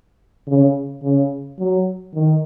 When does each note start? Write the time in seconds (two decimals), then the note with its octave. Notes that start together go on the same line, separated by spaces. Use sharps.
0.47 C#3
1.02 C#3
1.58 F#3
2.14 D#3